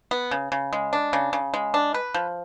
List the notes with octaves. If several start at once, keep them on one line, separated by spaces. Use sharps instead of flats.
B3
C#3
C#3
G#3
D4
C#3
C#3
G#3
D4
B4
F3